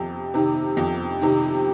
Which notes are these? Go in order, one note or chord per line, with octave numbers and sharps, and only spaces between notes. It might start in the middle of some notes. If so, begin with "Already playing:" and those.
Already playing: F2 C3
C3 D#3
F2
C3 D#3